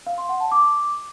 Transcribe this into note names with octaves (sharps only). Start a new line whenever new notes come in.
F5
C6
F#5
A5
D6